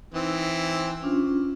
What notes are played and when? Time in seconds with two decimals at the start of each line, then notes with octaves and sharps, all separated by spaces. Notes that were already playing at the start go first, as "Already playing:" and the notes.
0.14 E3 C4 D#4
1.02 C#4 D4 F4